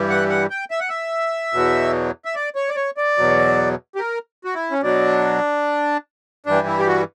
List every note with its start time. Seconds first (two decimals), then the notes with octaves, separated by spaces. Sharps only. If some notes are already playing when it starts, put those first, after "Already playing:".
Already playing: G2 E3 G3
0.10 F#5
0.29 F#5
0.50 G5
0.71 E5
0.80 F#5
0.89 E5
1.53 E2 B2 F#3
2.25 E5
2.35 D5
2.55 C#5
2.69 D5
2.76 C#5
2.97 D5
3.18 E2 B2 F#3
3.95 G4
3.99 A#4
4.45 F#4
4.55 E4
4.71 C#4
4.82 B2 F#3 D4
6.46 G2 E3 G3 D4
6.67 E4
6.79 G4
6.87 F#4